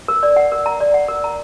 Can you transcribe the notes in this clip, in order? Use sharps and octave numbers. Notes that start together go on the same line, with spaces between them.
A#4
D5
F#5
A#4
A#5
D5
F#5
A#4
A#5